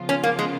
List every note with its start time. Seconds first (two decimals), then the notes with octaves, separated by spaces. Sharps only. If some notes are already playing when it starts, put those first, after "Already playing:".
Already playing: C#3 F3 B3 F4
0.09 C#4
0.24 A#3
0.39 G#3